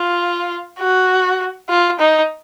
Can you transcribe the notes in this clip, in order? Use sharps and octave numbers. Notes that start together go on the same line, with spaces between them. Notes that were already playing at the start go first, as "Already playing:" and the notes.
Already playing: F4
F#4
F4
D#4